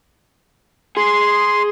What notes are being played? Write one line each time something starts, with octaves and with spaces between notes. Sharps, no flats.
G#4 C6